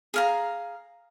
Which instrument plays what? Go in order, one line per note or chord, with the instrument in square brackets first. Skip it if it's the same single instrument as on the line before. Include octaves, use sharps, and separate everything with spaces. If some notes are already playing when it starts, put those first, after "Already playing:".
[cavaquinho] G#4 F5 A#5